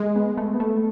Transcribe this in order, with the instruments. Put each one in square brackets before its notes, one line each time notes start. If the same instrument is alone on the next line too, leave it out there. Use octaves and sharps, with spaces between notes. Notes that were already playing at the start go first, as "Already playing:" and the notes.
Already playing: [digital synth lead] G#3
[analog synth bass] B3
A3
B3
A3